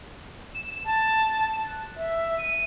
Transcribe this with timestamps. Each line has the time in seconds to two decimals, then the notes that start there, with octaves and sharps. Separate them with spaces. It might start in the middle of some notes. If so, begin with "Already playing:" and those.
0.54 E7
0.84 A5
1.67 F#6
1.95 E5
2.38 D#7